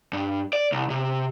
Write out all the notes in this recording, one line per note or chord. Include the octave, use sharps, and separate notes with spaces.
G2
D5
C2
C3